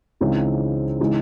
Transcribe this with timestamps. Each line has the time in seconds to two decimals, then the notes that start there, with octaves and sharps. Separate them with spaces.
0.21 C#2 C#3 E3 C4 D#4
1.00 C#3 E3 G#3 D#4